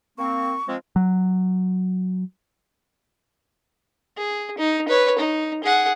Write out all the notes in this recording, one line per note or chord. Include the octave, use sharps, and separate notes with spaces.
A#3 C4 C#6
F3 G#3 C4
F#3
G#4
D#4
B4 C#5
D#4
G#4 F#5